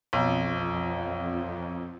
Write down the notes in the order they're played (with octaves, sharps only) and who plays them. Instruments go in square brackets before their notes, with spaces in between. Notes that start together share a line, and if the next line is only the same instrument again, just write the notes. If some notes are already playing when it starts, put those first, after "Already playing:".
[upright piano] B1 [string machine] F2